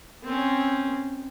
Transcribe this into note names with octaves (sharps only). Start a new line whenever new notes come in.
C4 C#4